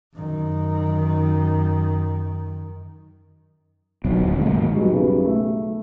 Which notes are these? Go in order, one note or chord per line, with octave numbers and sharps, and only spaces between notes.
F#2 D#3
D1 B2 F#3 C4
D#1 D3
G#3 A#3
G#2 D#3
F#3 G3 B3 D#4 G4 G#4
B1 C#3 G3 B3
A3